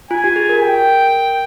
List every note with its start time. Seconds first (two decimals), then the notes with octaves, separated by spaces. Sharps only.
0.11 F4 G#5
0.24 G4
0.36 G#4
0.49 A#4
0.62 A#4 G5